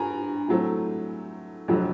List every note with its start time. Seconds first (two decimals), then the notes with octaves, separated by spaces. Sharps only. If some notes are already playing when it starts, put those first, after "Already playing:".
Already playing: G2 G#5 A#5
0.48 A2 F#3 A3 C4
1.68 F1 F2 D3 F#3